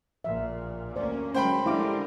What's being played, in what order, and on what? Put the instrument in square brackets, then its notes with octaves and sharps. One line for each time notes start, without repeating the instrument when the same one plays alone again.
[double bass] A#1 A#2 [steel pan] E5
[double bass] D2 A#3 [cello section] C#4 [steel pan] C5 D5
[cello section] F#3 G#3 A3 [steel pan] C#4 [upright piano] C5 G5 B5
[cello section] D3 A#4 [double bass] G3 G#3 [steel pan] E4 F5 D6